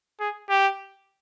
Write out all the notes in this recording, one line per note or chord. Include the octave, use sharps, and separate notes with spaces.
G#4
G4